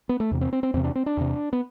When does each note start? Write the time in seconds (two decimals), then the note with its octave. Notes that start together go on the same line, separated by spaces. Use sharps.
0.09 B3
0.20 A3
0.31 E2 C3
0.41 C4
0.53 C4
0.63 C4
0.74 E2 C3 C4
0.84 D4
0.95 C4
1.06 D4
1.17 E2 C3
1.53 B3